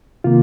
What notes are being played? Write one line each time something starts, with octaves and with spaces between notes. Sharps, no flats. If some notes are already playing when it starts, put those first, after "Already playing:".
C3 D#3 A#3 F4